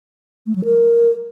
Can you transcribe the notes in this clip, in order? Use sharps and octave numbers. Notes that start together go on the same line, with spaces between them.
A3
F#3
A#4